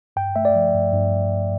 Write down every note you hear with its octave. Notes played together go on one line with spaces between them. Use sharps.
G2 G5
A3 E5
D5
F3
G2
G2